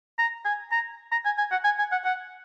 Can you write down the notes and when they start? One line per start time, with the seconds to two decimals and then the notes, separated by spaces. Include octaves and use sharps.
0.19 A#5
0.45 G#5
0.72 A#5
1.12 A#5
1.25 G#5
1.38 G#5
1.52 F#5
1.64 G#5
1.79 G#5
1.92 F#5
2.05 F#5